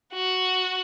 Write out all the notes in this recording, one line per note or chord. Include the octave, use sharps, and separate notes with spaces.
F#4